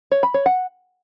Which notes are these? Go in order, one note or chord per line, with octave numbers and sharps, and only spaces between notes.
C#5
B5
C#5
F#5